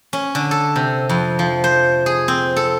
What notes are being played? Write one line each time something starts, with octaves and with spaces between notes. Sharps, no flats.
C#4
D3
A4
C3
F2
F3
C5
G#4
C4
A4